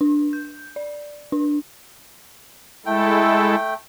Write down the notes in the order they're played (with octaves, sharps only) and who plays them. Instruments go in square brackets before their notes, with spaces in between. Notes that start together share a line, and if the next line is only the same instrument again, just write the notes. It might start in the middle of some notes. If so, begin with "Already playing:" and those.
[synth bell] D4
G6
D5
D4
[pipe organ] G#3 E4 A4 [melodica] A3 G5